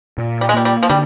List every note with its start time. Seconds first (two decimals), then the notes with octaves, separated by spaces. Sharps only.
0.18 A#2
0.41 G3
0.49 G#3
0.54 G3 A#3
0.65 G3
0.83 F3
0.89 D3 G3